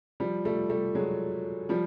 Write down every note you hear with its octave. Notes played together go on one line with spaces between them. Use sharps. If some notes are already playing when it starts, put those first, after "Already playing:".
F3 G3
G3 A3
G3 A3
F#3 G#3
F3 G3